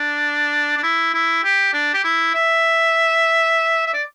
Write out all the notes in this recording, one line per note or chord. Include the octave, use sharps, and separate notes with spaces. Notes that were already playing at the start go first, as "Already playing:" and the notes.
Already playing: D4
D4
E4
E4
G4
D4
G4
E4
E5
E5
D5